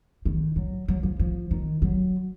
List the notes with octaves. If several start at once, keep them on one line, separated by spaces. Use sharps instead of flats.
D#3
F#3
F#3
F3
F3
D#3
F#3